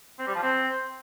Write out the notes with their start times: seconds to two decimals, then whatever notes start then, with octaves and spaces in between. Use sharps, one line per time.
0.19 C4
0.27 G3
0.35 F3
0.43 C4